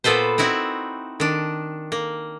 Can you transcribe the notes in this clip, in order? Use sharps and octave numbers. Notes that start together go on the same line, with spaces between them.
A#2 B3 A4 B4 C5
C4 D#4 E4 F#4
D#3 D4
A#3